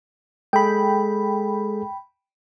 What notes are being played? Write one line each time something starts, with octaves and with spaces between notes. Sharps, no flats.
G#3 G#4 A4 G5 B5